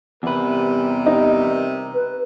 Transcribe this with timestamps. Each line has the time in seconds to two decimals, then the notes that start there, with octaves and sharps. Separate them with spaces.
0.23 E2 C3 G3 A#4 B4
1.06 D#4
1.94 B4